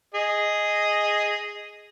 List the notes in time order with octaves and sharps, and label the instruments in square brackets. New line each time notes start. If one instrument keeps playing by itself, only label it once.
[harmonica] G#4 D#5